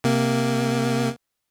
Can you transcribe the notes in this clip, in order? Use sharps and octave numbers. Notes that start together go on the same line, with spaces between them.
C3 A#3